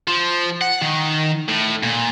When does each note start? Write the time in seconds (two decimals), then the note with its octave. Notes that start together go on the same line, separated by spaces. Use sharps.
0.07 F3
0.61 F#5
0.82 D#3
1.48 A2
1.83 A#2